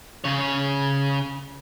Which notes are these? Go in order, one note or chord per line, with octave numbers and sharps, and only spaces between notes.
C#3 C#5